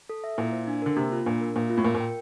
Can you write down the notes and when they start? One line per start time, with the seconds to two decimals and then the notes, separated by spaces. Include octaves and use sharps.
0.09 A4
0.24 E5
0.38 A#2 E4
0.52 C5
0.67 D4
0.82 D3 A#4
0.96 C3 A#3
1.12 F4
1.26 A#2 D4
1.41 A#4
1.56 A#2 A#3
1.70 F4
1.78 A2
1.85 A#2 A#4
1.95 A#2
2.00 G5